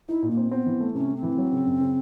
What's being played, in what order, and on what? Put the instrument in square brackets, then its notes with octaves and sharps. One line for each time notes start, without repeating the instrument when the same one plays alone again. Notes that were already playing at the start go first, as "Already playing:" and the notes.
[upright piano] D#4 [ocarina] E4
[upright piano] A#2
[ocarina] A#3
[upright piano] C4
[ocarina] B3 [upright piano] C4
[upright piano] E3
A3
[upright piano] C3 [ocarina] C#4
[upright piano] A3
[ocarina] C4
[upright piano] E3
F#3
C#3
F#2
C#3